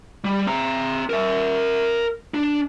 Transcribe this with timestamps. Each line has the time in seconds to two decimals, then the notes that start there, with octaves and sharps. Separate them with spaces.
0.25 G3
0.46 C4 A#5
1.10 A#4 E5
2.34 D4